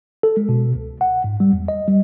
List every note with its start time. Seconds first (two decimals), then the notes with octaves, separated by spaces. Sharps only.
0.23 A4
0.37 G#3
0.49 B2
0.75 C#2
1.01 F#5
1.24 G#2
1.40 G3
1.53 E2
1.68 D#5
1.88 G3